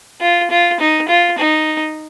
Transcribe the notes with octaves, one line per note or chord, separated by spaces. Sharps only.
F4
F4
D#4
F4
D#4